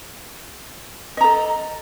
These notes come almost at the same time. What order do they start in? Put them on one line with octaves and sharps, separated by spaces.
D#5 A#5 A4